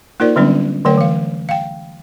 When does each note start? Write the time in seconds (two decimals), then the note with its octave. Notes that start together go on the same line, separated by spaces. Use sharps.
0.20 A#3 D#4 F4 A#4 C5 D5
0.36 D3 F#3 G3 B3 C#4 D4
0.85 D3 F#3 A3 A#4 C#5 G5
0.98 E3 F5
1.49 F5 G5